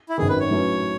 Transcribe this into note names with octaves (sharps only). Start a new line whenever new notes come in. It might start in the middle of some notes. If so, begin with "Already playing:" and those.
E4
G#1 F#2 D#3 G#4
B4
C#5
A2 F#3 C#4 E4 B4